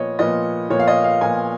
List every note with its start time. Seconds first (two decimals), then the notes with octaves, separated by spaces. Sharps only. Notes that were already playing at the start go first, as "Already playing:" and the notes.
Already playing: A#2 F3 B3 C#5 D#5
0.19 A#2 F3 B3 D#5
0.70 A#2 F3 B3 C#5
0.79 F5
0.88 D#5
1.04 F5
1.21 A#2 F3 B3 G#5